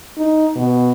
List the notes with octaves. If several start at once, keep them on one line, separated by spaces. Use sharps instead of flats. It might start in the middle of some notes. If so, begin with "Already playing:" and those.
D#4
B2